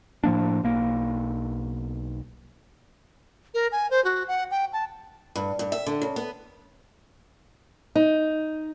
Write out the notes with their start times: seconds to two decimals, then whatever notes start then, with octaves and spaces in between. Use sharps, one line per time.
0.24 A2 F3 A#3 D4
0.63 B1 A#3
3.54 A#4
3.72 G#5
3.91 C5
4.05 F#4
4.28 F#5
4.51 G5
4.73 A5
5.36 G2
5.59 G2
5.72 E5
5.86 D3
6.02 C#3
6.16 B3
7.95 D#4